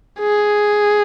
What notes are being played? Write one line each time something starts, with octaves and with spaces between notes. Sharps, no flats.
G#4